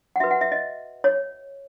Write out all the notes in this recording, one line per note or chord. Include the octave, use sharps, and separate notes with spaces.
F#5
F#4 B4 E5
F#5
E5
D#5
C#5